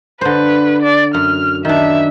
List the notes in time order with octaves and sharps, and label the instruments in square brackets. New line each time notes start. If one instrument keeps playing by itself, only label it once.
[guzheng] D3 C5 [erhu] B4
[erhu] D5
[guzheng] F#2 [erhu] F6
[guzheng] D#3 D4 [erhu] E5